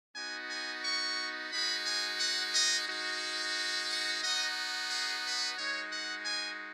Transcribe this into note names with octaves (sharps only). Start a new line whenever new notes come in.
B3 D#4 F#4 G#5
G#5
C#6
G#3 D#4 F#4 B5
G#5
F#5
D#5
G#3 D#4 F#4
F#5
B3 D#4 F#4 D#5
G#4
B4
G#3 D#4 F#4 C#5
F#5
G#5